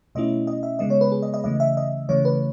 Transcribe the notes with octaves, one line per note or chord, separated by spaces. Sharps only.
B2 A3 C#4 E4 D#5
D#5
E5
C#3 G#3 B3 D#5
C#5
B4
G#4
D#5
D#5
C#3 E3 A3 D#5
E5
D#5
C#3 E3 A3 C#5
B4